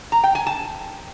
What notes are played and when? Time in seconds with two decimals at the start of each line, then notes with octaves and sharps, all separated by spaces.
0.12 A#5
0.24 G5
0.35 G#5
0.47 A5